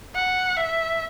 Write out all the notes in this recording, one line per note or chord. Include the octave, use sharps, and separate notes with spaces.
F#5
E5